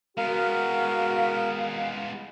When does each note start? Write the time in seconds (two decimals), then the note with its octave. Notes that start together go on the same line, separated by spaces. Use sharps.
0.17 G#3 B3 F#4 A#4 F5